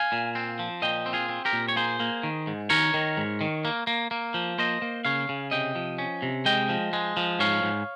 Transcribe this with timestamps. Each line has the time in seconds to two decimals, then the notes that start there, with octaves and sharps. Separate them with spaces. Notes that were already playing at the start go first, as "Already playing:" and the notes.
Already playing: F5 G#5
0.12 A#2
0.35 C4
0.59 F3
0.82 A#2 D#5 G5
1.06 C4
1.13 F4 G#4
1.29 C4
1.45 G4 A#4
1.53 A#2
1.68 C#5
1.76 A#3 G#4 C5
2.00 A#3
2.23 D#3
2.47 G#2
2.70 D#3 A#4 C#5
2.94 D#3
3.17 G#2
3.41 D#3
3.65 A#3
3.87 A#3
4.11 A#3
4.34 F3
4.58 A#3 C5 D#5
4.82 A#3
5.05 C#3 C#5 F5
5.29 C#3
5.51 C3 D#5 G5
5.75 F3
5.98 C#4
6.22 C3
6.45 G#3 D#5 G5
6.69 F3
6.93 G#3
7.17 F3
7.39 G#2 C#5 F5
7.63 G#2